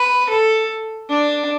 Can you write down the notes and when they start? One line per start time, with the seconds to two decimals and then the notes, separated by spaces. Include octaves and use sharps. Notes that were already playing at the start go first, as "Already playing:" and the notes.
Already playing: B4
0.30 A4
1.10 D4